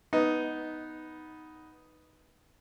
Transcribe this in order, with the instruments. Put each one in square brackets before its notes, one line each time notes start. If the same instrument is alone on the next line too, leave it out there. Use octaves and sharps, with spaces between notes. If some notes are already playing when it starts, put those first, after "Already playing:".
[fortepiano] B3 D#4